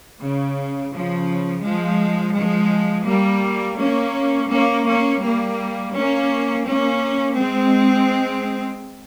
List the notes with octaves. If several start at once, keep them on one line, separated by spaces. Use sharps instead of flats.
C#3
C#3 F3
F3 G#3
F3 G#3
G3 A#3
A#3 C#4
A#3 C#4
A#3 C#4
G3 A#3
A#3 C#4
A#3 C#4
G#3 C4